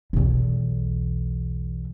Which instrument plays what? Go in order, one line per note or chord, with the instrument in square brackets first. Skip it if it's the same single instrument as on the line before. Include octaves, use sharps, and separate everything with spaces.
[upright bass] B1 E2